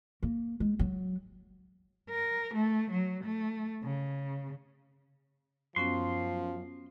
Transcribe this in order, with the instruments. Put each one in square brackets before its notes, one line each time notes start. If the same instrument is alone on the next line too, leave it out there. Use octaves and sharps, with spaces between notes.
[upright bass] A#3
G#3
F#3
[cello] A#4
A3
F#3
A3
C#3
[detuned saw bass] F#2 [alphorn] F3 [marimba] B3 C#4 F#4 [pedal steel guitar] C6